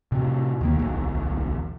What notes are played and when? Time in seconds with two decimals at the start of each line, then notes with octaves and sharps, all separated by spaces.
0.12 A2 C3
0.61 D#2 D#3 A#3
0.78 D1 B1 E2